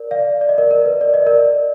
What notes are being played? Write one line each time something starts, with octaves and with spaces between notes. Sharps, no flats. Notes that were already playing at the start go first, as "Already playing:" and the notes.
Already playing: A#4 D5
D5 F5
D5
D#5
A#4 D5
A#4
B4
D5
D#5
A#4 D5